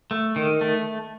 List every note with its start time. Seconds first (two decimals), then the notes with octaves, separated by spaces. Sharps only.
0.11 A3
0.36 D#3
0.61 A3